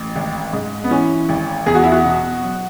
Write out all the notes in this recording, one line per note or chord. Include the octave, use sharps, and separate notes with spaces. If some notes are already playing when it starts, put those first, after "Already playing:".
Already playing: A1
G#1
G#2
B3
E3 C#4
G#1
E2 G#4
F#4
E4
F#4
B2
F#3